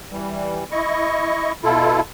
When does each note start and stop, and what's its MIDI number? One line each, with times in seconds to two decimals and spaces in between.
0.11 0.64 52
0.11 0.64 55
0.72 1.52 64
0.72 1.52 75
0.72 1.52 85
1.63 2.01 47
1.63 2.01 64
1.63 2.01 65
1.63 2.01 69